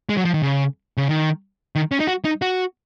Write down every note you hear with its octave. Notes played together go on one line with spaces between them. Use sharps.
G#3
F#3
F3
D#3
C#3
C#3
D#3
D#3
C#4
D#4
F#4
D#4
F#4